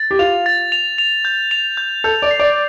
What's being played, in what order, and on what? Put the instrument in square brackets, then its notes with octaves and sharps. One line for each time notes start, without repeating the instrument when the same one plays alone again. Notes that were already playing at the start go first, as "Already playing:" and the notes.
Already playing: [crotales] A6
[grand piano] G4
[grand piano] F4 [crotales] F7
[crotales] A6
F7
F7
G6
F7
G6
[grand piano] A4 [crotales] G6
[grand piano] D5
[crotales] C7
[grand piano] D5